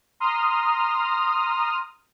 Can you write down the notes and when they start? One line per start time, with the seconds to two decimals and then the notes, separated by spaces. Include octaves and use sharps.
0.20 A#5 C6 D#6 F6